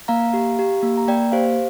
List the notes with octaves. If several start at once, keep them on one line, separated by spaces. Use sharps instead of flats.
A#3 F5 A#5
G4
G4
A#3
A#5
A#3 D5 G5
G4 C5 F5